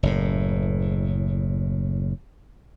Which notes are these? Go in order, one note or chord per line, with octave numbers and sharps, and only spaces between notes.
F#1 A2